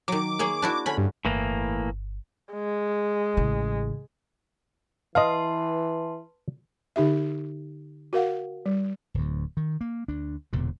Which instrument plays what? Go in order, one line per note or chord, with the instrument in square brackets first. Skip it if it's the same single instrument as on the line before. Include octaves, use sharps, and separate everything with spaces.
[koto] D#3 F#3 [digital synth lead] D6
[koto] A#3 G#4 C#5
D4 E4 F#4
[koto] D3 C#4 [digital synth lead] B5
[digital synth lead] G2
[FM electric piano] G1 [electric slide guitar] A2 E3 A#3
[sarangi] G#3
[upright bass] A1 C#3
[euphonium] E3 [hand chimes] B4 A5 C6 [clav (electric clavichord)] D#5 F5
[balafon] D3 D#4 G4 E5
F#4 A#4 F5 F#5
G3
[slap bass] D1 D2
D#3
A#3
D2 D4
E1 E2 A#2 D3